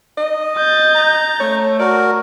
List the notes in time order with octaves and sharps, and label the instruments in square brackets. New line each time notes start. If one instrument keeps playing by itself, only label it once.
[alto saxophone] D#5
[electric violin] G6 A6
[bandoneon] A#5
[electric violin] A3 [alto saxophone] C#5
[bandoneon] F#4 A#4 [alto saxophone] D5